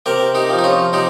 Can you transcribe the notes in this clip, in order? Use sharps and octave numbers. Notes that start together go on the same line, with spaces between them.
C3 G4 A#4
D#4 G4
F3
D#4
C#4 F4
C3 D#4 G4